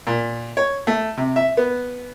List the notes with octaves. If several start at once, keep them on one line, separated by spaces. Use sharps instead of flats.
A#2
C#5
A3
C3
E5
B3